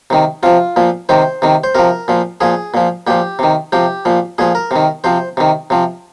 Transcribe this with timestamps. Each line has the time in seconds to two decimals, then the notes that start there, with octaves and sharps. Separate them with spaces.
0.10 C3 D#3
0.43 C3 F3 F4
0.76 A#2 F3
1.09 C3 D#3 C5
1.42 C3 D#3
1.64 C5
1.75 C3 F3 A#4
2.08 A#2 F3
2.41 A#2 F3 G#4
2.74 A#2 F3
3.07 A#2 F3 G4
3.39 C3 D#3
3.72 C3 F3 G4
4.05 A#2 F3
4.38 A#2 F3 G#4
4.55 A#4
4.71 C3 D#3
5.04 C3 F3 C5
5.37 C3 D#3
5.70 C3 F3